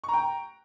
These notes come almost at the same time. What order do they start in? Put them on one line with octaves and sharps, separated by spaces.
C#6 A#5 G5